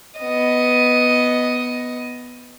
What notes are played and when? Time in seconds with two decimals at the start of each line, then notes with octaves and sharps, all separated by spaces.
0.20 B3 D#5